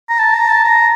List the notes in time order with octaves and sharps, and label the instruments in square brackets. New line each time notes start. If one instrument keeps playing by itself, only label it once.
[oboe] A#5
A5
A#5
A5
A#5